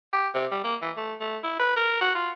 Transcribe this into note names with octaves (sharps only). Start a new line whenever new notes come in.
G4
C3
G3
A#3
E3
A3
A3
E4
B4
A#4
F#4
F4